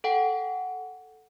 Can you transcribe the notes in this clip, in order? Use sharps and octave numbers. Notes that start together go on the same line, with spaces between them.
A4 F#5 G5